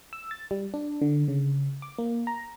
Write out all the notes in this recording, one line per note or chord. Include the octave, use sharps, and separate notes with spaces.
E6
A6
G3
D4
D3
C#3
D6
A#3
A#5